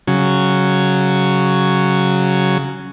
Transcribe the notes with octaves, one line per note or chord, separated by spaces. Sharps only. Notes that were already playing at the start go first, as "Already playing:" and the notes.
C#3 F#3